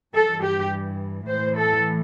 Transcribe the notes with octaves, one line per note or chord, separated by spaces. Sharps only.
G2 E3 A4
G4
A2 E3 C5
A4